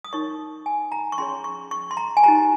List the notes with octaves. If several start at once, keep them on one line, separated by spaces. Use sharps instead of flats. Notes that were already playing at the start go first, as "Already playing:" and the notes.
D#6
D#4 A#4 C#5 C#6
G#5
A#5
C#6
C#4 G#4 C#5 C6
C#6
C#6
C6
A#5
G#5
D#4 G4 C5 A#5